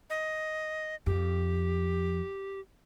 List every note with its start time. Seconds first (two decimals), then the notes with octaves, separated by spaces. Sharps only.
0.10 D#5
1.06 F2 G4